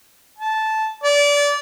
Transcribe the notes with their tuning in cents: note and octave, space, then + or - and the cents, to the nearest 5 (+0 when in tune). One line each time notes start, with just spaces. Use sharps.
A5 -10
D5 -25